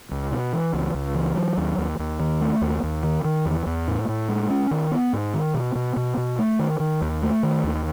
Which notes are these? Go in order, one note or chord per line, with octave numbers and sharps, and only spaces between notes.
C#2
B2
E3
C#2
C#2
E3
F#3
D#2
D#2
D#2
D#3
A3
D#2
D#2
D#3
D#3
E2
E2
A2
A2
G#3
C#4
D#3
B3
G#2
D#3
B2
B2
B2
B2
A3
D#3
D#3
D#2
A3
D#3
D#2